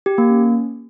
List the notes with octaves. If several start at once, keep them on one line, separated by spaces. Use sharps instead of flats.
G4
A#3
C#4